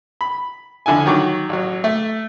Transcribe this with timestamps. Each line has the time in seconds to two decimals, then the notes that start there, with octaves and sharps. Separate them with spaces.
0.21 B5
0.86 F2 D3 E4 G#5
1.06 D#3 F#3 C#6 D6
1.49 A1 F#3
1.84 A3